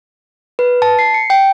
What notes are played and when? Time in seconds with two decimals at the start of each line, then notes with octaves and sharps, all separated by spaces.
0.59 B4
0.82 A5
0.99 C7
1.14 C#7
1.30 G5